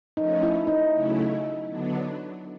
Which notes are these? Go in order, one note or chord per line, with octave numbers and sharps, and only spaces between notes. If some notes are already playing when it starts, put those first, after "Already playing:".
F3 A3 C#4 D#4
E4
D#4
C#3 F#3 A3 C#4 E4
D3 F#3 B3 D4